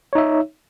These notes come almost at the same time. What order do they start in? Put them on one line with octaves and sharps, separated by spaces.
C#5 D#4 E5